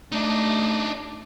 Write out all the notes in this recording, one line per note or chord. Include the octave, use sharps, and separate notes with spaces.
A3 D4 D#4